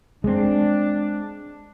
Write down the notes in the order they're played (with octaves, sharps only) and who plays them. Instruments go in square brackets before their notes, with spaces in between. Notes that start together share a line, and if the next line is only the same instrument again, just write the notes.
[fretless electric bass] G#3 C4 [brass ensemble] D4